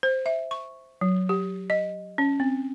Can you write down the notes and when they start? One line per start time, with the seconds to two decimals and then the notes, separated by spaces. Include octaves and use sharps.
0.03 C5
0.26 E5
0.51 C#6
1.01 F#3
1.29 G4
1.70 D#5
2.18 C#4
2.40 C4